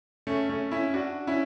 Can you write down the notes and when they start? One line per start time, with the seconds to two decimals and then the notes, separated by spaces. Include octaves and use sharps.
0.27 A3 C#4
0.49 A3 C#4
0.71 C#4 E4
0.94 D4 F#4
1.27 C#4 E4